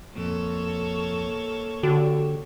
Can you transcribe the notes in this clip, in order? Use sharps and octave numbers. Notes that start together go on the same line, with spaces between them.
F2 A#2 A#3 A4 C#5
D3 F#4 G4